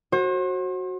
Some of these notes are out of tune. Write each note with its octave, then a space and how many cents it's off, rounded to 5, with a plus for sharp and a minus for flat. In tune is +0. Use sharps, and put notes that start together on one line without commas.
F#4 +0 C5 +40